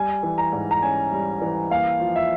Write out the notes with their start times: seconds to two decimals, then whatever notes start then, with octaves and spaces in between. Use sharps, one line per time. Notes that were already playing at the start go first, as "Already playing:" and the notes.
Already playing: G3 G#5
0.23 E3
0.38 A#5
0.52 G#2
0.71 A#5
0.82 C#4 G#5
1.12 G3
1.42 E3
1.70 A#3 F5
2.00 F3
2.16 E5